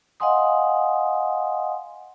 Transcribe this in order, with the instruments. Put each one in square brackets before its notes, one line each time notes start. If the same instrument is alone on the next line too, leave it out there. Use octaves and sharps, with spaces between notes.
[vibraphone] D#5 F5 F#5 G#5 C6 D#6